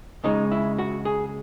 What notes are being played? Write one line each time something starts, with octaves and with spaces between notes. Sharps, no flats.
C#2 C#3 G#3 D#4
E4
F#4
G#4